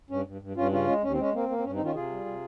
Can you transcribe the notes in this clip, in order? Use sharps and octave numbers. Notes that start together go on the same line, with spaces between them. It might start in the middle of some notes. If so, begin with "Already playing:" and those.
G2 C#4
G2
G2
G2 C#4 F4
C#3 C#4 F4
G#3
D#2 C#4
C4
G#3 C#4
A#3 C4
A#3
C4
G2 C#4
C4 D#4
D#3
C#4 F4
C3 F4 G#4
G3
C3